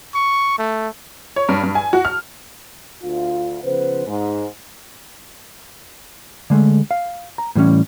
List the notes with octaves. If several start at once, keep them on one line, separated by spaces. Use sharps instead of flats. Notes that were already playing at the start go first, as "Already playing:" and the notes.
C#6
A3
C#5
G2
G2
G#5
F#4
F6
D2 F4
C#3 F3 B3 B4 C5
G#2
D3 G#3 A3
F5
A#5
A2 E3 G3 C#4